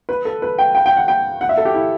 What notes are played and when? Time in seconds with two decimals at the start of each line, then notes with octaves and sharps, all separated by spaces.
0.09 B4
0.25 A4
0.42 B4
0.59 G5
0.75 G5
0.86 G5
0.97 F#5
1.08 G5
1.41 F#5
1.49 E5
1.57 A4
1.65 G4
1.74 E4